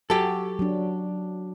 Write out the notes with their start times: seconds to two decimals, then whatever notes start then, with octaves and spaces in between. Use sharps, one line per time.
0.10 F#3 F#4 G4 A4
0.59 F#3 D4